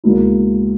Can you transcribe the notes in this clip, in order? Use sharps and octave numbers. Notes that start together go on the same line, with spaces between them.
C#2 B2 A#3 E4